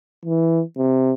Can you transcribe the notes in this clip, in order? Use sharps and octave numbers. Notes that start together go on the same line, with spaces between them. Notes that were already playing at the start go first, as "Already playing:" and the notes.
E3
C3